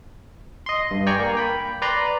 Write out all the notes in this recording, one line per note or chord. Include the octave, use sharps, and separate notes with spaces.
D#5 C6
G2
D5 G5 G#5 A#5 C#6
A#3
G5 B5
B4 D5 A#5 C6